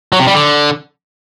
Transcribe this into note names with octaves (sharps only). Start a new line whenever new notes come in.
F#3
C3
G3
D3